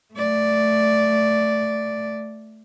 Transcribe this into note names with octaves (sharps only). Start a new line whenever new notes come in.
A3 D5